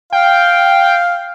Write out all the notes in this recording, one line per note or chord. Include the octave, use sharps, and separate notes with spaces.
F5 G5